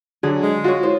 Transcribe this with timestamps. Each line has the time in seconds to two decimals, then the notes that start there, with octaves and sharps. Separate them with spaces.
0.23 D3 F#3 D4 G#4 A4
0.42 G#3
0.64 F4 F#4 C#5
0.83 E4 F#4 C5 C#5